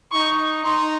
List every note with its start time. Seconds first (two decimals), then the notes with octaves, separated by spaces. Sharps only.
0.12 D#4 C#6
0.64 D#4 C6